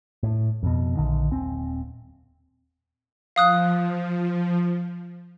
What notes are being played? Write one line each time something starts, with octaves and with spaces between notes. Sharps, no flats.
A2
F2 B2
A#1 D3 D#3
D#1 C4
F3 F5 D#6 F#6